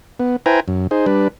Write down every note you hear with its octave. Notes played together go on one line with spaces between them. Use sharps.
B3
E4 B4 C5 G5 G#5 A#5
F#2
D#4 G#4 C5
G3 D4 B4